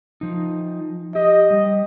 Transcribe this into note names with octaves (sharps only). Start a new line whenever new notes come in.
F3 D#4
G4 D#5
G3